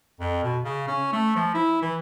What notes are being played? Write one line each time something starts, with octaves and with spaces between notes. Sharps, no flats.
F2
B2
C#3
C#4
A3
F3
E4
E3